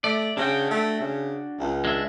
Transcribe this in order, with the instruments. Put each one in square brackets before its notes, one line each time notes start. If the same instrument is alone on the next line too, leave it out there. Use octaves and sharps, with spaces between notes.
[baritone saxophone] A3 [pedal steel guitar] D5
[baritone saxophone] C#3 [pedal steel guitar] D4 F#4 G5
[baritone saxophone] A3
C#3
C#2
[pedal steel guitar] G#3 D4 E5